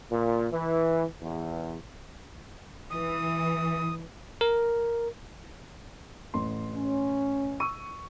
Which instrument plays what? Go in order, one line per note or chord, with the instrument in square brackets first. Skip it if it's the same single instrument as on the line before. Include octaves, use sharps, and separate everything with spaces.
[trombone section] A#2
E3
E2
[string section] E3 [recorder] D#6
[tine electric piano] A#4
[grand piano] A1 C6
[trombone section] C#4
[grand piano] C#6 E6 D#7